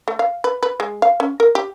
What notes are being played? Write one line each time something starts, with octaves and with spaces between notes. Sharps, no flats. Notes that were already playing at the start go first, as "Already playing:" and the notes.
A3
F5
B4
B4
G#3
F5
C#4
A#4
G4